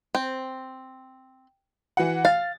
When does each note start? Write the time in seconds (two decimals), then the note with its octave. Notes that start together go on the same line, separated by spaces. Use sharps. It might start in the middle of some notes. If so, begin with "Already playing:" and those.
0.15 C4
1.97 E3 F#4 F#5
2.25 F5 A6